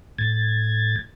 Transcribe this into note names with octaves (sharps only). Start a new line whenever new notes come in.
A2 G#6 A6